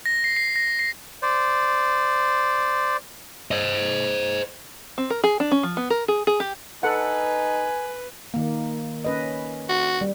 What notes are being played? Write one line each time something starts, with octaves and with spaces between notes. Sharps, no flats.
A#6
C7
C7
A#6
C7
C5 D5
C5 D#5
C4
A#4
G#4
D4
C#4
F3
B3
A#4
G#4
G#4
G4
D#4 A4 B4 F#5 G#5
D#3 A#3
C#4 B4 D#5
F#4
G3